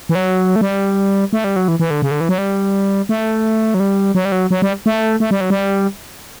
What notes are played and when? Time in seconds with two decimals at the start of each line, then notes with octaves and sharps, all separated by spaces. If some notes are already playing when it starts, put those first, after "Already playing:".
0.09 E3
0.15 F#3
0.56 A3
0.61 G3
1.33 A3
1.44 G3
1.56 F#3
1.68 E3
1.80 E3
1.91 D3
2.02 C#3
2.11 D3
2.21 E3
2.29 F#3
2.38 G3
3.09 A3
3.74 F#3
3.80 G3
4.15 F#3
4.25 G3
4.32 F#3
4.51 F#3
4.62 G3
4.86 A3
5.20 A3
5.31 G3
5.41 F#3
5.50 G3